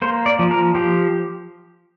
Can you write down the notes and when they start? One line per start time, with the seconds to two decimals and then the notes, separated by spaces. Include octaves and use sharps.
0.02 A#3 C5
0.26 D5
0.39 F3
0.51 A#4
0.75 F3 G4